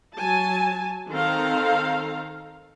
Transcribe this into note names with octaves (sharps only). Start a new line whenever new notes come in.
F#3 G#5 A5
D#3 C4 A4 F5 A#5